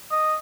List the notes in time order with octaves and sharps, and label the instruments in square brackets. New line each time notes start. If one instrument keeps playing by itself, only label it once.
[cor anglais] D#5